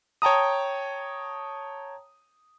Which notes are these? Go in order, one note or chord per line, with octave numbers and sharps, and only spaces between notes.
C#5 G5 A5 A#5 D#6